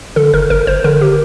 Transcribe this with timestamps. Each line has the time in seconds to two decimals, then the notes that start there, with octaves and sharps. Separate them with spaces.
0.16 D3 A4
0.33 G1 A#4
0.50 G1 A#4
0.67 G1 C5
0.84 D3 A#4
1.01 G4